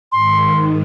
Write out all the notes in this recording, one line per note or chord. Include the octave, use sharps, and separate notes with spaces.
G#2 D#3 C6